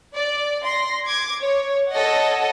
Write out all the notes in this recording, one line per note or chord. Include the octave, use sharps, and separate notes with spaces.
D5
C6 A#6
D6 G#6
C#5
A4 C#5 D#5 F#5